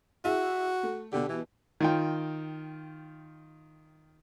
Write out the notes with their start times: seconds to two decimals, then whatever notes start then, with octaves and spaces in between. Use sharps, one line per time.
0.25 E4 F#4 G#4 E5
0.83 A3
1.13 B2 D3 G4
1.29 E3
1.80 D#3 F4 G5